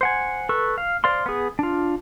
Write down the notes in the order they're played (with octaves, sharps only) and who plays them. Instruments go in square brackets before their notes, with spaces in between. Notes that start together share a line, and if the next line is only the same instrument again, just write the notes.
[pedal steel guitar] C5 F#5 G#5
A4 B4 C#6
F5
C5 D5 F5 C6
B3 G#4
D4 F4